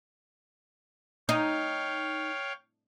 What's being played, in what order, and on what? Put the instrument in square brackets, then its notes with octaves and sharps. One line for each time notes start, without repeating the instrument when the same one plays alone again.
[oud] D#4 [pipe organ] C#5 F5 G5